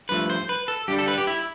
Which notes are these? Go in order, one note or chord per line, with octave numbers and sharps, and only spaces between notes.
G2 F3 A3 B4
C5
B4
A4
G2 D3 G3 G4
A4
B4
G4
E4